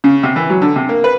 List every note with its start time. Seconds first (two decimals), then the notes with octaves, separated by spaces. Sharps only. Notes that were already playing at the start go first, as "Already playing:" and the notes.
0.04 C#3
0.23 C3
0.36 E3
0.50 F#3
0.62 D3
0.76 C3
0.89 A#3
1.04 B4